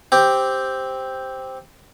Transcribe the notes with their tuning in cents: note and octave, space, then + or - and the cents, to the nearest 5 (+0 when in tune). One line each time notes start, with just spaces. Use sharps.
C4 +0 G4 +0